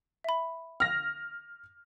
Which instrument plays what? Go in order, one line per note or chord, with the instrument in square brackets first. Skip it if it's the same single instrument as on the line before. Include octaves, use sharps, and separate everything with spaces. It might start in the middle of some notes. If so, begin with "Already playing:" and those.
[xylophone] E5 B5
[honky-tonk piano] F6 A#6